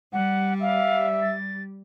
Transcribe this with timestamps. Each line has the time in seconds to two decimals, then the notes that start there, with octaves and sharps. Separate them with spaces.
0.13 G3 F#5
0.62 E5 F5
1.22 A6